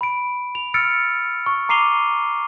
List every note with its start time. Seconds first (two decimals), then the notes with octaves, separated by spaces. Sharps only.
0.01 B5 D7
0.55 F7
0.74 E6 F6 A6 C#7 D7
1.46 C#6
1.69 A#5 D6 C7 D#7 F7 G7